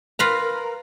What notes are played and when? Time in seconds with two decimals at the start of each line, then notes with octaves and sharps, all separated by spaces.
0.19 F4 A#4 B4 A#5